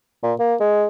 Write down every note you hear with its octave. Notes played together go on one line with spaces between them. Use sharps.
A#2
A#3
G#3